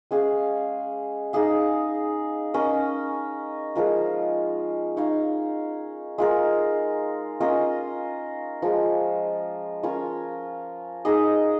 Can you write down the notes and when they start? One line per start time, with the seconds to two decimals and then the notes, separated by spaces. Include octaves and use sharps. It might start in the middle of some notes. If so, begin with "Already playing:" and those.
0.11 G#3 C#4 G#4 F5
1.33 D#4 G#4 F5
2.54 C#4 A#4 D#5
3.75 F3 G#3 F4 A#4
4.97 D#4 C#5 F5
6.18 G#3 F4 A#4
7.41 C#4 F4 A#4 D#5
8.62 F3 G#3 F4
9.83 C#4 F4 A#4 C#5
11.05 D#4 G#4 D#5